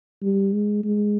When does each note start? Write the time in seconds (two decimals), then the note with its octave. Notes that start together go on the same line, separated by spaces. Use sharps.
0.22 G3
0.53 G#3
0.84 G#3